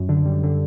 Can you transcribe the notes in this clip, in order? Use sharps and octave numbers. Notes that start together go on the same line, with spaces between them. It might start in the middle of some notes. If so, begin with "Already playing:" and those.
Already playing: F#2
D3
G3
D3